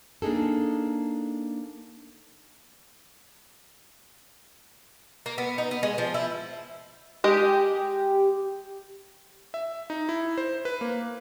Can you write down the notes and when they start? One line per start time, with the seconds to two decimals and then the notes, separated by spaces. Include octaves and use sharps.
0.22 A#3 D4 D#4 G#4 A4
5.26 A#3
5.38 B3
5.58 D#4
5.71 B3
5.83 G#3
5.98 F3
6.14 E4
7.24 G#3 G4 D#5
9.54 E5
9.90 D#4
10.09 E4
10.38 C5
10.65 B4
10.81 A#3